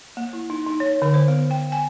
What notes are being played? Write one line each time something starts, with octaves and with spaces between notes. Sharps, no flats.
A#3
E4
D#4
D#4
C#5
D3
C5
B3
G5
G#5